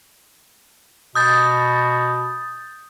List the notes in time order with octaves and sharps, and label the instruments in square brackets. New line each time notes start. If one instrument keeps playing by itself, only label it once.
[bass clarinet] B2 [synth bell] D#6 G6 A6